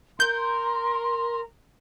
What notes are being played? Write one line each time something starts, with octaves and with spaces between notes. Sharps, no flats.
A#4 C6 G6